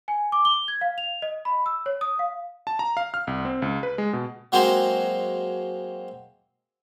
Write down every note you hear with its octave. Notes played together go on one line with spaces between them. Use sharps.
G#5
D6
G7
G#6
F5
F7
D#5
B5
E6
C#5
D#6
F5
A5
A#5
F5
F6
C2
C4
C#2
B4
G#3
B2
F#3 G#3 A#3 C4 C5